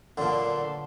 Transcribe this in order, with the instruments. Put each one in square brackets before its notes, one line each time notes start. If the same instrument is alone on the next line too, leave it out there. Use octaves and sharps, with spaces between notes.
[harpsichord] A#2 D3 [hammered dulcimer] F#3 B3 D4 [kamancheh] A5 C6